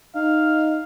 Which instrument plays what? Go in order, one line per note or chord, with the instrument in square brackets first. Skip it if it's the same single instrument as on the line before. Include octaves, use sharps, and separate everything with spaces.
[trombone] D#4 [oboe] F5